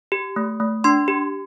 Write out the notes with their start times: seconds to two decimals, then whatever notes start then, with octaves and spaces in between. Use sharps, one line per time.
0.12 G4
0.36 A3
0.60 A3
0.84 D4 C6
1.08 G4